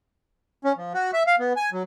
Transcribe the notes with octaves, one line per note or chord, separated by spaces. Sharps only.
C#4
F3
F#4
E5
F5
B3
G#5
F#3